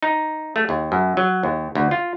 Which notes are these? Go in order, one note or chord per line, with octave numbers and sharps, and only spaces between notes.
D#4
A3
D#2
F#2
F#3
D#2
D2
F4